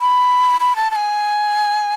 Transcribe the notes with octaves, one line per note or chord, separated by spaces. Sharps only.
B5
B5
A5
A5
G#5